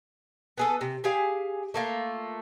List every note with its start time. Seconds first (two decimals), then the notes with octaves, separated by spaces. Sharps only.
0.58 B3 G#4 A4
0.81 C3
1.04 G4 G#4 F5
1.74 A3 A#3 F4